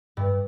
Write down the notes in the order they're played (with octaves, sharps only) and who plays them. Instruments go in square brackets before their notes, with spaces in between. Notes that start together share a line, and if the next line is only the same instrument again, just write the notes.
[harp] G2